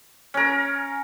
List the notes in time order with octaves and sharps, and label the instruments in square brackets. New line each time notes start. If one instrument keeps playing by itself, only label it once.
[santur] C#4 A#4